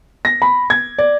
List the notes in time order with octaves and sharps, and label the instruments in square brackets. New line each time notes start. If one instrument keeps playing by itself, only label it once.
[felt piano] A#6
B5
G#6
D5